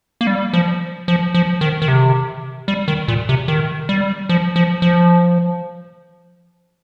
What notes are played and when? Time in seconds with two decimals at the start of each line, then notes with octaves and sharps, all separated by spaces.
0.21 A#3
0.27 G3
0.53 F3
1.08 F3
1.34 F3
1.61 D#3
1.82 D#3
1.88 C3
2.68 G3
2.88 D#3
3.08 A#2
3.29 C3
3.48 D#3
3.89 G3
4.29 F3
4.56 F3
4.82 F3